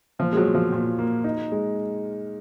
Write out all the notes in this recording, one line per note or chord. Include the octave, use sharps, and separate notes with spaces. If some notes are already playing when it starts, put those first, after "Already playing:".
A#2 F3
G#3
F#3
A#2
F3
A#2
A#3
D#4
G#3